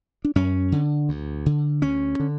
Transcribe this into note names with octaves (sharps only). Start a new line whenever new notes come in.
D4
F#2 C#4
D3
D2
D3
D2 C#4
D3